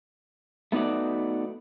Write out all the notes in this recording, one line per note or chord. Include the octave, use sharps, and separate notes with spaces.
A3 B3 D#4 F#4 D5